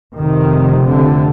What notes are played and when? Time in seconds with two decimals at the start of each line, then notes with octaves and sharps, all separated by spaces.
0.16 F1 F2 C3 D#3
0.88 D3